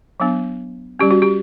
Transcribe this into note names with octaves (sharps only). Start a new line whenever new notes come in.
F#3 B3 D4
G3 C#4 G4
F#4
G4